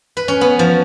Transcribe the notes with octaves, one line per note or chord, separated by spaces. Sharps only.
B4
C#4
B3
F3